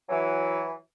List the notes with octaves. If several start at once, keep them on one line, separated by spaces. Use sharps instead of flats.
E3 F#3